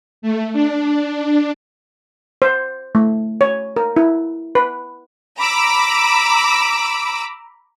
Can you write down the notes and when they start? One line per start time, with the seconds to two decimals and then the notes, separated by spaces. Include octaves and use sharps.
0.22 A3
0.53 D4
2.42 C5
2.95 A3
3.41 C#5
3.76 A#4
3.97 E4
4.55 B4
5.38 A#5 B5 D6 E6